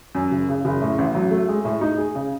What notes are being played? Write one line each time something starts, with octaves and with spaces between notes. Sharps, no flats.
F#2
F#1
C#3
F#1
A2
A1
F#3
A3
G#3
A2
D#4
G#4
C#3